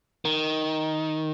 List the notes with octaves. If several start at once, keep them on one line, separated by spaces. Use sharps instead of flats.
D#3